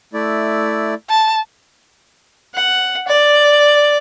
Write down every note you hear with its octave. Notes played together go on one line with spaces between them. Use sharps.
A3 E4 D5
A5
F#5
D5